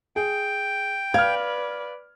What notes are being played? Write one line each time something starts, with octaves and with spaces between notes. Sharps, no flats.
G#4 G5
B4 D5 F5 F6 G#6